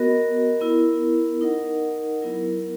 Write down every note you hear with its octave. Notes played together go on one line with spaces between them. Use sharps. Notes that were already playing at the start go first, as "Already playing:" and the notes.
Already playing: B3 F#4 A#4 D#5
B3 E4 A#4
D#4 A#4 D#5 F#5
F#3 B3 E4 A#4